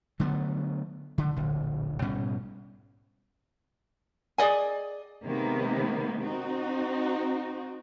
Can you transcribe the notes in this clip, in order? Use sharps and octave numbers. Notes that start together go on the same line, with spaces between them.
D3 F#3 A3 B3
D3
D1 A#1 D3
G#2 B2 G3 C#4
G#4 D5 D#5 G#5
C3 D#3 G#3 A#3 B3
C4 D#4 F#4